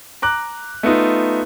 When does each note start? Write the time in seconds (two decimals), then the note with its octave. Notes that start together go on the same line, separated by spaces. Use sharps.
0.22 A#5 D6 F#6
0.83 A3 B3 D#4 F4